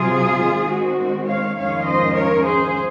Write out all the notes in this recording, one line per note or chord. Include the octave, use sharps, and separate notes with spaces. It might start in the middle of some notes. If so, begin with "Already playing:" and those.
Already playing: C3 F#3 C4 F4 G#4
D#3 G#3 C4
F#4
C#5 F5
F2 D#3 G#3 C#4 F4 C#5 F5
C5 D#5
A#4 C#5
G#4 C5